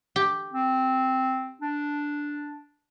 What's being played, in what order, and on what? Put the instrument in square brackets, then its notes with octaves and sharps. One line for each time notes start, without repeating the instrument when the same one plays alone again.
[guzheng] G4
[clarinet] C4
D4